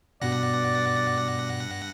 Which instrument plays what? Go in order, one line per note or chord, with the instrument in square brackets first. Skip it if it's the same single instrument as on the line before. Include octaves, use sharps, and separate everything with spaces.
[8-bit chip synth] G2 F#5 A#6 [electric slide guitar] B2 B3 F#4 [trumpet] D5